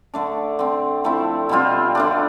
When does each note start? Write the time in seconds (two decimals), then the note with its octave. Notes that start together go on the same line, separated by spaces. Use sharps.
0.14 D3 A3 D4
0.59 D3 A3 C4
1.04 F3 A3 C4 E4
1.49 B2 G3 C4 F4
1.95 D3 A3 D4